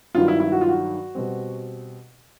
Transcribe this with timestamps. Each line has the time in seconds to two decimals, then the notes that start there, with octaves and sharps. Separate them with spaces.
0.15 G2 D#3 F#3 F4
0.28 E4
0.40 E4
0.52 F#4
0.61 F4
0.69 F#4
1.15 B2 G3 C4